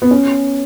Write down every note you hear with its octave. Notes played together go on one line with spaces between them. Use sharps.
B3
C#4